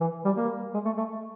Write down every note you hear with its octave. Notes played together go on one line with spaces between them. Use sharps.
E3
G3
A#3
G#3
A3
A3